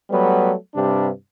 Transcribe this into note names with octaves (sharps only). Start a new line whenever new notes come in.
F#3 G3 A3 B3
G2 C3 G3 D4